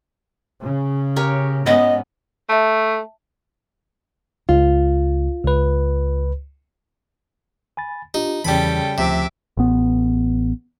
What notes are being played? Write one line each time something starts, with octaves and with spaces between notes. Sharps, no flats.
C#3
G4 A#4 C#5
G#2 B3 C#4 D#5
A3 E5 A5
C#2 F4
C#2 B4
G#5 B5 A6
D4 D#4 F4 G4
E2 C#3 E3 G3 A4 G5 B5
D2 C3 F3 E5 D6
A1 B3